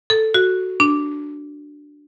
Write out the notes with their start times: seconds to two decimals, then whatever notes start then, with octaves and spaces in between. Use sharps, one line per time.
0.10 A4
0.34 F#4
0.80 D4